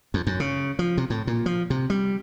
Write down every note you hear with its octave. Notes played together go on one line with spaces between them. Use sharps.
F2
F#2
C#3
F3
C3
A2
A#2
F3
C3
G3